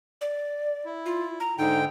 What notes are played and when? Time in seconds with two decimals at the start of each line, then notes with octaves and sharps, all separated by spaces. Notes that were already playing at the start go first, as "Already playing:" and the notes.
0.21 D5
0.85 E4
1.06 F4
1.40 A#5
1.58 G#2 D3 D#4 G5